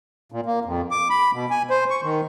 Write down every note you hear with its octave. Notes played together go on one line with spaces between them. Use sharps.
A#2
A#3
F2
D6
B5
B2
G#5
C5
C#6
D#3